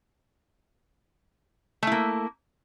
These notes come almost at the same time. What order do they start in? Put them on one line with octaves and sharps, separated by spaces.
A3 E4 A#3